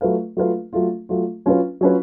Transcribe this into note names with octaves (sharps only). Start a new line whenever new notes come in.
F#3 A3 F4 B4 F5
F#3 A3 F4 B4 F5
F#3 A3 F4
F#3 A3 F4
F#3 C#4 F4 B4
F#3 C#4 F4 B4